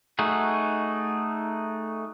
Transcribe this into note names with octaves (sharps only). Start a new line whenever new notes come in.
A3 D#4 F#4 G#4